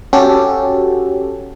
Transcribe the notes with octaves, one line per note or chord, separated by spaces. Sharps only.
C#4 F#4 G4 A4